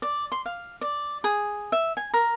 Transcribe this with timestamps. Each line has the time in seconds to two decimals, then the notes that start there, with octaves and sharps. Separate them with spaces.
0.02 D5
0.32 C6
0.46 F5
0.81 D5
1.24 G#4
1.72 E5
1.97 G#5
2.14 A#4